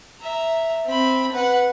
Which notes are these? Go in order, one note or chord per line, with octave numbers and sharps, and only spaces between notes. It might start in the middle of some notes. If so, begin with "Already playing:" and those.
E5 A#5
C4 B5
B4 F#5